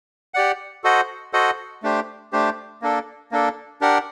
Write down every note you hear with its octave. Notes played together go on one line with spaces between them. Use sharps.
G4 D5 F#5
F#4 A4 C5 D#5 F#5
F#4 A4 C5 D#5 F#5
A3 D4 G4 C5
A3 D4 G4 C5
A#3 D4 A4
A#3 D4 A4
D4 G4 A#4 F#5